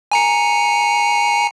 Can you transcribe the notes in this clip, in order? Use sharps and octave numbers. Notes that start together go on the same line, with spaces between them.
G#5 A#5 C#7